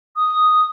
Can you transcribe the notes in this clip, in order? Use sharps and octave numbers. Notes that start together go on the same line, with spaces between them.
D#6